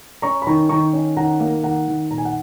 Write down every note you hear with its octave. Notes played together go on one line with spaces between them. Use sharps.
C#4 A#5 C#6
B5
D#3 A#5 C#6
D#3 A#5 C#6
C#4
D#3 F#5 A#5
A#3
D#3 F#5 A#5
D#3
A#2 A#5
G#5
F#5